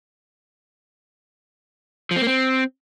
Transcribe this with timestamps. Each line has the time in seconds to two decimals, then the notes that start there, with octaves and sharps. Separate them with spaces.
2.11 F3
2.16 C4
2.22 A#3
2.27 C4